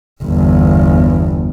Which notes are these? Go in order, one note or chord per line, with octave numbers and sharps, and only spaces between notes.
G1 E2